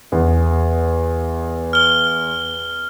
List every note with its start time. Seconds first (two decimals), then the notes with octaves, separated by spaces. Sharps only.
0.12 E2
1.73 F6 G7